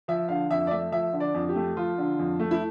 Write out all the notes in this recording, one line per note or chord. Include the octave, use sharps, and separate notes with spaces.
F3 E5
D3 F5
F2 E5
D5
A3 E5
F3 E5
D3
D5
F2
G4
A3
F3 F4
D3
F2
A3
E4